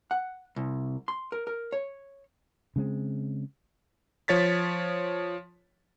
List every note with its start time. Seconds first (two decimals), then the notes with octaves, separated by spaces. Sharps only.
0.11 F#5
0.56 C2
1.08 C6
1.32 A#4
1.47 A#4
1.72 C#5
2.76 C#3 G#3 C4
4.28 F3 C#5 A6 B6